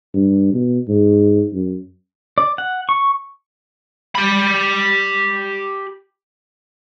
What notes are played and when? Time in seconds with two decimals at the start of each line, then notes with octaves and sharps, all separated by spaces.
0.14 G2
0.53 B2
0.88 G#2
1.53 F#2
2.38 D5
2.58 F#5
2.89 C#6
4.15 G4 B5